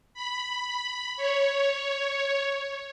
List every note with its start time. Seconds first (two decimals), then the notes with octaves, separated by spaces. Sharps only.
0.14 B5
1.17 C#5